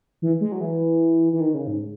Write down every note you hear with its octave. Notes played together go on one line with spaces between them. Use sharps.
E3
G#3
F#3
E3
E3
D#3
C#3
G#2